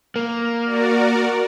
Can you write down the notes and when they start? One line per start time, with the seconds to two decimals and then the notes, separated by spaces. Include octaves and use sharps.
0.16 A#3
0.65 F#4 A#4 D5